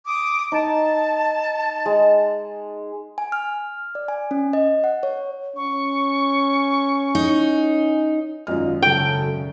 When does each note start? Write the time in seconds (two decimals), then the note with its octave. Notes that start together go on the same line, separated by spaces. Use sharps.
0.06 D6 D#6
0.52 D#4 A5
1.86 G#3
3.18 G#5
3.32 F6
3.95 D5
4.08 G#5
4.31 C#4
4.53 D#5
4.84 F#5
5.03 C#5
5.56 C#4 C#6
7.15 D#4
8.47 G#1 F#2 D#3 F4 D#5 F6
8.82 C#3 F#3 A4 G5